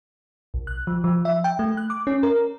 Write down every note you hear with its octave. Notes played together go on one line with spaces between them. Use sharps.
B1
F#6
F3
F3
E5
G5
A3
F#6
D6
C#4
A#4